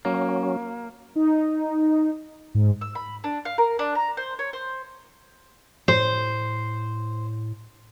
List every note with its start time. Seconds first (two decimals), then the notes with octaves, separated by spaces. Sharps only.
0.05 F#3 A#3 C#4
1.16 D#4
2.55 G#2
2.81 E6
2.95 B5
3.24 D4
3.45 F5
3.58 A#4
3.79 D4
3.95 A#5
4.17 C5
4.39 C#5
4.53 C5
5.88 A2 C5